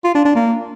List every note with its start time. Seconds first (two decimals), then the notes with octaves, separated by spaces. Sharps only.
0.04 F4
0.15 D4
0.25 D4
0.35 A#3